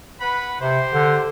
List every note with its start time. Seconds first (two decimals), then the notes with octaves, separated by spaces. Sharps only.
0.20 B4 F#5 B5
0.60 C3 G4 C5
0.94 D3